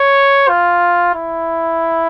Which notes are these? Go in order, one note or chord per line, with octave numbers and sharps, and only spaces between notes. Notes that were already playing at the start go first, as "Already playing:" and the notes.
Already playing: C#5
F4
E4